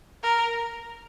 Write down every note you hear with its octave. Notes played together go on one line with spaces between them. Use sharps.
A#4